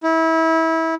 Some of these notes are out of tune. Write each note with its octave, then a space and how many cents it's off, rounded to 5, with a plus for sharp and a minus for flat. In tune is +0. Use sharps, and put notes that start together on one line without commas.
E4 -25